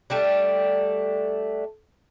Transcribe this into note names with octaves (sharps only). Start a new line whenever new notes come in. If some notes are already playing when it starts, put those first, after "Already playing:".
G3 A3 D4